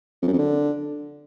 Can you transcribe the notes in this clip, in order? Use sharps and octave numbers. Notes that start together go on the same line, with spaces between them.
F2
F#2
F2
D3